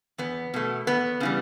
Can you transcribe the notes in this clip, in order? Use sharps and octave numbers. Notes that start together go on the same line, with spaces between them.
E2 B3
B2 A3
E2 B3
C#3 E3 G3